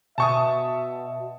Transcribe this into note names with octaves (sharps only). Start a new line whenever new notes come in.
B2 E5 A5 C#6 D#6